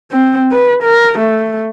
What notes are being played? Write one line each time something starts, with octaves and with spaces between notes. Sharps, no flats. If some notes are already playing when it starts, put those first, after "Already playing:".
C4
B4
A#4
A3